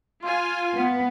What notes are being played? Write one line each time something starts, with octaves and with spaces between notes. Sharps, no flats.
F4 F5 G#5 C6
B3